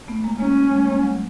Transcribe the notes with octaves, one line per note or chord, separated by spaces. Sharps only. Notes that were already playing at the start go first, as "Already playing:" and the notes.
A3 B3
G#3 A#3
G#3 A#3 C#4
G3 A3
G#3 A#3
F#3 G#3